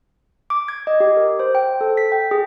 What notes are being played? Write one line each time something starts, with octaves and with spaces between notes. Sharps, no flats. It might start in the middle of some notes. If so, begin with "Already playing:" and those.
D6
G#6
D#5
G4
A#4
C5
G5
A4
B6
G5
G#4